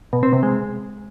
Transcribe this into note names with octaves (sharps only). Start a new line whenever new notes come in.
B2
C4
C3
G#3